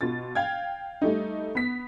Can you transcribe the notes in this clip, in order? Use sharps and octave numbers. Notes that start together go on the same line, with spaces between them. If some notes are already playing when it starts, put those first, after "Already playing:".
B2 F4 A6
F5 G5 G#6
G3 A3 D#4
B3 B6